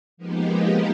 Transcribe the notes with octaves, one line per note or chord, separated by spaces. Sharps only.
F3 G#3 A#3 B3 D#4 G4